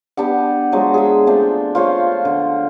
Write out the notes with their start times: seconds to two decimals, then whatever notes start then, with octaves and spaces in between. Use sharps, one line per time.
0.17 B3 D4 G4 F#5
0.72 F3 F#3 G#3
0.94 G#4 E5
1.27 F3 A3 C4 D4
1.75 F4 C5 C#5 F5
2.25 D3